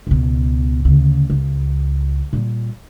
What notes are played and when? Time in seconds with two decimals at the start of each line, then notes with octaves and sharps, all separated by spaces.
0.07 C#2 B2
0.85 D2 C#3
1.30 C#2
2.33 A#2 G3